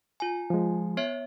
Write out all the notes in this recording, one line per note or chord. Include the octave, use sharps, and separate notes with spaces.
F4 G#5
F3 G#3
B3 C#5 E5